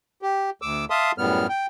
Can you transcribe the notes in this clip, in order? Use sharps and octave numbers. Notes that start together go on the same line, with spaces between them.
G4
D2 D6 E6
E5 F5 A5 C6 D#6
F#2 A2 G3 B3 F6
G5